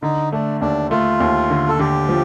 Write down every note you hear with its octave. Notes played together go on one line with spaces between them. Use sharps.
D3 D#4
A3 D4
D#2 D4
A3 F4
D#2
D3
A4
D3 G4
F3